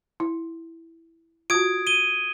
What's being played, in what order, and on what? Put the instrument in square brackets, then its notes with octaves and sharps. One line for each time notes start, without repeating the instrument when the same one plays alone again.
[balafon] E4
[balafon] F4 F#4 [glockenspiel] D#6 G#6 D7
[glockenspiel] D#7 G7